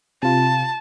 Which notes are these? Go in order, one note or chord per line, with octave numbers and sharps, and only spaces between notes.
C3 F4 A5